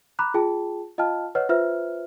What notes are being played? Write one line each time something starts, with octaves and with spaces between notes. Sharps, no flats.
A#5 B5 D6 F#6
F4 G#4 G5 A5
F4 D#5 F5 G5 A5 F6
B4 C#5 D#5 F#5 F6
F4 B4 C5 E5 F6